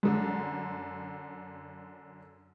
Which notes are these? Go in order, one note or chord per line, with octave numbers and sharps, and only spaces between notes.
F#2 D3